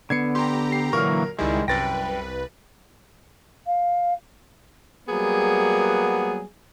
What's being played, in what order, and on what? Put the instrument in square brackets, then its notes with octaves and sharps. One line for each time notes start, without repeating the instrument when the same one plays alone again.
[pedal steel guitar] D3 B3 [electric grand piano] G#6 C7 C#7
[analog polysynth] G4 A#5 [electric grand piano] C6
[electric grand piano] C7
[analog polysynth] A#2 D3 F#3 [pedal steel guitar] E3 A#3 C#6 [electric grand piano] A#4 F6
[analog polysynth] C#2 G3 E4 [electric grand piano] D#3 [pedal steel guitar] G#3
[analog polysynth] C2 B4 [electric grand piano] F#2 A6 A#6 [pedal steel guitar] G5
[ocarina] F5
[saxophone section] F#3 G3 A#3 B3 G#4